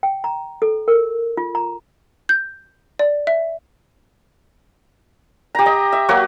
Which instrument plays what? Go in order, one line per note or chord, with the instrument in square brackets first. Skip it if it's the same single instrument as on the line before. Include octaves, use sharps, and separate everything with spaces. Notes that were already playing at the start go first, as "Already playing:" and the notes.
[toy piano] G5
A#5
A4
A#4
F4
A#5
[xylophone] G6
D5
E5
[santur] G4 A#5
D#5
E5
F#3 A#3 F#4